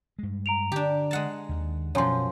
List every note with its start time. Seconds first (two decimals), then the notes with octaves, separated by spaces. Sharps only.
0.19 G2 G#3
0.46 A#5 D7 F7
0.72 D3 D4 G4
1.11 G#3 F#5 A5
1.49 D#2 D#3
1.95 F#2 B2 F3 C#5 G#5 C6